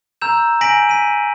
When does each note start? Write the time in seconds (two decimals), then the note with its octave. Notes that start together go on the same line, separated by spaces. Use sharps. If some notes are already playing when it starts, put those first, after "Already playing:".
0.21 A#5 E6 G6 E7
0.61 G#5 G6 A#6 B6 D7 F#7
0.89 B6 D#7